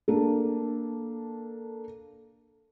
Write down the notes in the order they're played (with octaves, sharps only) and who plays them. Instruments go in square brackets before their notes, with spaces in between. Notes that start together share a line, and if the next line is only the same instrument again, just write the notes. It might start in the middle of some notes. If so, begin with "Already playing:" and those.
[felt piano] A#3 D4 A4